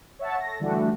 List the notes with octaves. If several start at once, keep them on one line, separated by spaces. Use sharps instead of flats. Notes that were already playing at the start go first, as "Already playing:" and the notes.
C#5 E5 F#5 A5
A4 A#6
D3 E3 G3 A3 D4 F#4